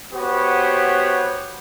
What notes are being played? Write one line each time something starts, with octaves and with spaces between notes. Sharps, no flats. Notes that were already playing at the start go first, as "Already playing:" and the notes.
B3 F#4 G4 C5 C#5